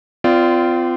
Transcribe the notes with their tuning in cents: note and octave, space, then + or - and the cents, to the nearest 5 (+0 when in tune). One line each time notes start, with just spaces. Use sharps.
C4 -35 F4 -15 D5 +0